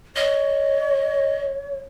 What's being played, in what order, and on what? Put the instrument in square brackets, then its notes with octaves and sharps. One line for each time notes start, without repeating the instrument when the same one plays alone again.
[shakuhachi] C#5 [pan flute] D#5